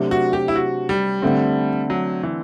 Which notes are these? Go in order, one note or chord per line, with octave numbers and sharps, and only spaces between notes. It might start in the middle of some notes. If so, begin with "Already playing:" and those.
Already playing: C3 F#3 A3 D4
F#4
G4
E4
F#4
G3
D3 A3 C4
F#3
E3